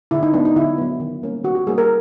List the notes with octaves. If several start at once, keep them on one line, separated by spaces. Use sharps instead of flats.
D3 E4
D#4
F#3 B3 D4
D#4
D3 E4
F#3 B3
D#3
G3 A#3 C#4
D#3 F#4
G4
G3 A#3 C#4 G#4
A#4